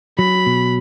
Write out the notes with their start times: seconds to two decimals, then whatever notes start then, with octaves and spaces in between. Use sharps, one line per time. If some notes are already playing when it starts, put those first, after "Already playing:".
0.19 F#3 B5
0.46 B2